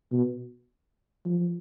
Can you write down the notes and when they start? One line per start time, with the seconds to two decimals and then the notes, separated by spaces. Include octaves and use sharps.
0.12 B2
1.26 F3